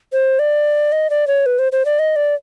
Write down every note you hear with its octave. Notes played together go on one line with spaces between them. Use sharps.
C5
D5
D#5
D5
C#5
B4
C5
C5
D5
D#5
D5